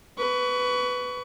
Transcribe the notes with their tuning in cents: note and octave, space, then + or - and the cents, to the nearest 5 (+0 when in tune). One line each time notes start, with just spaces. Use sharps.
B4 +10 C#6 +30